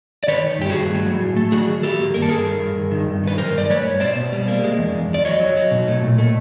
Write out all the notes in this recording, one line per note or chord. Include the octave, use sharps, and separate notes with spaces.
D5
D#3 B4 C#5
D#3
G2 G4
G2 F#4 G#4
A3
F#3
A2
A3
F#3 F#4 G#4
D#3
D#3 G4 A4
A#3
G2 A#4
A4
G2 G#4 A#4
D#3
G2
G2
D#3
G2
D#3 B4
F#3 A#4 C5
G2 D5
A3 B4 C#5
G2
B2 C5 D5
B2
G3
A#3
G#3
E2
E2
E2 D5
F#3 C#5 D#5
F#3
F#3
B2
A3
A#2
A3